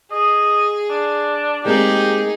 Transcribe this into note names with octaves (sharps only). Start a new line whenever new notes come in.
G#4 D#5
D4
G#3 A#3 C4 D#4 G4 G#4